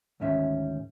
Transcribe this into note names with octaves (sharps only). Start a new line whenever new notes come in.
D2 G#2 D#3 C#4 E5